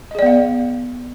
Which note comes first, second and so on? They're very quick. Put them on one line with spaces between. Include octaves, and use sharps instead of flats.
D#5 G#4 D5 B3 F5